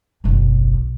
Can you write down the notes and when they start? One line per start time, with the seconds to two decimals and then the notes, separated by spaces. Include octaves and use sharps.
0.24 F#1 B1